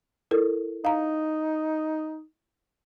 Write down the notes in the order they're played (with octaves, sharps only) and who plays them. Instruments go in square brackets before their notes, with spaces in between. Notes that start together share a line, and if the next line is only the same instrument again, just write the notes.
[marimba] E4 A4 A#4
[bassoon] D#4 [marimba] F5 A#5